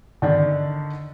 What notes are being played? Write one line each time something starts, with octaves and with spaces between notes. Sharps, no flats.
D3 D#3 D4